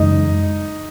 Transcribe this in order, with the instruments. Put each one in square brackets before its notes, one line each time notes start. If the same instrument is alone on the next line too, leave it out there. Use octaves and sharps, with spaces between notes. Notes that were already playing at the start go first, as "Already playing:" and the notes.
Already playing: [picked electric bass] F#2 C#3 E3 G#3 [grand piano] D#4